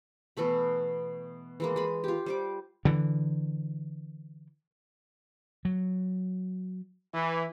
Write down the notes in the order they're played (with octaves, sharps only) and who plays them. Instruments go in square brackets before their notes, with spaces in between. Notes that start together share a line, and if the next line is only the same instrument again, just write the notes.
[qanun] B2 E3 A3 B5
E3 G#3 A#3
G#3 B5
F4 G4
G3 C5 D6
[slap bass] D3 E3
F#3
[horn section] E3